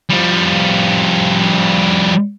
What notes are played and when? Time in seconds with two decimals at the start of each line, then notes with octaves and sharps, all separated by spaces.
0.10 F3 G3